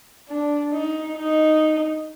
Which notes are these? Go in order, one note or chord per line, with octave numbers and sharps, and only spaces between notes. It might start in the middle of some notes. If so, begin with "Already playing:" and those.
D4
D#4
D#4